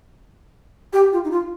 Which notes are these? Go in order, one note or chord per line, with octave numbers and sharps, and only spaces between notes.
G4
F4
D#4
F4